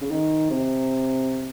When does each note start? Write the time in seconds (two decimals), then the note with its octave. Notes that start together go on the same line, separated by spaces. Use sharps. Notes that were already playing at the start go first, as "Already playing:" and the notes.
0.01 C#3
0.11 D#3
0.50 C3